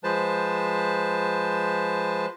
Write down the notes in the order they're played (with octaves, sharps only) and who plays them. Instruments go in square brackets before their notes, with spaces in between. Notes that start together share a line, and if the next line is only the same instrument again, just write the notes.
[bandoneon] F3 G#3 B4 C5 A5